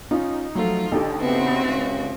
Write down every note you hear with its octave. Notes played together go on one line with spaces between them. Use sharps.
C#4 D#4 F4
F3 F#3 A3 F4
A1 D3 D#4 G4 A4
C#3 B3 C4 F#4 E5
C#2 C#3